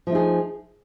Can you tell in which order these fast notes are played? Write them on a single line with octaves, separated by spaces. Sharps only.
F3 A3 D#4 G#4